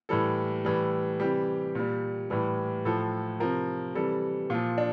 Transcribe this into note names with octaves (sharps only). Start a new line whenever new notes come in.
A2 E3 G3 A4
A2 E3 G3
C3 E3 G3 G4
A#2 G3
A2 E3 G3
A2 F3 A4
C3 F3 A#4
C3 E3 G3 A4
A#2 F3 F4
D4